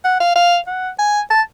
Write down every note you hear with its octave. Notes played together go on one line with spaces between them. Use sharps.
F#5
F5
F5
F#5
G#5
A5